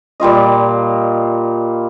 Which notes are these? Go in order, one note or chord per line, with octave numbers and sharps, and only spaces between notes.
A#2 G3 F4 D#5